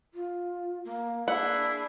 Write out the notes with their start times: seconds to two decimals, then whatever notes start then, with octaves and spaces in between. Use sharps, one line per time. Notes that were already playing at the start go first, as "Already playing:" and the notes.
0.14 F4
0.84 A#3
1.28 A#3 D4 E4 G#4 F#5